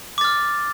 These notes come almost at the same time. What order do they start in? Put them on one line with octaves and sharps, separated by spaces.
D6 A6 F6